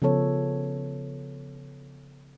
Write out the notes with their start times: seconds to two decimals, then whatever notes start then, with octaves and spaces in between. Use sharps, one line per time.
0.02 C#3 F3 B3 A4 C#5